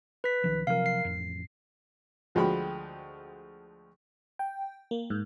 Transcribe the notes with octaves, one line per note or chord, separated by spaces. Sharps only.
B4 B6
B1 D#3 F3
C3 F3 F#3 A#4 F5
C7
A1 F2
D2 F3 G#3 F#4 G5 B5
G5
A#3
G#2